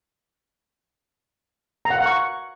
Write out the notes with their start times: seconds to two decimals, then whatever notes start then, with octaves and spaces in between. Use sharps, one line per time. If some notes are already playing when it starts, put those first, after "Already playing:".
1.85 A#5
1.90 F#5
1.96 F5
2.01 F#5
2.06 C#6